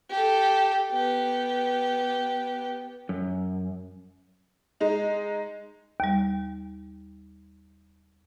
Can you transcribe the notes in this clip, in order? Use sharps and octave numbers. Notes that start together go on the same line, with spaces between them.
G4 A4
B3 G4
F#2
G#3 D#4
D#2 G3